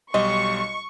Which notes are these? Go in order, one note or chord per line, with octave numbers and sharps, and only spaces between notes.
B1 G3 D#5 C6 C#6